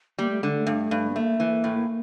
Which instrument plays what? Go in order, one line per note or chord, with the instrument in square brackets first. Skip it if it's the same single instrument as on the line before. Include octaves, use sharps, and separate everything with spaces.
[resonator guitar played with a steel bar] G3 [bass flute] A#3
[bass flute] A3
[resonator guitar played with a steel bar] D3 [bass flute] G#3
[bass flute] A3
[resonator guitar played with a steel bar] G2
G2
[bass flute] B3
[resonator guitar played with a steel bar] A3 [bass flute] A#3
[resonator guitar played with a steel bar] E3
A2